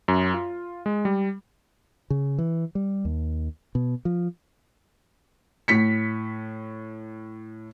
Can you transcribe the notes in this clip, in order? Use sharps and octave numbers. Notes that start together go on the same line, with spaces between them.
F#2
F4
G#3
G3
C#3
E3
G3
D#2
B2
F3
A2 B6 C#7